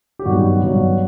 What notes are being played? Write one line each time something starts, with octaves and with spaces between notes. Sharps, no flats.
G4
G2 D#3 F#3 B3 F#4
G2 D#3 F#3 B3